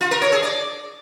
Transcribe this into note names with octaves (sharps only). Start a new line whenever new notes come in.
F4
A#4
C#5
G#4
D5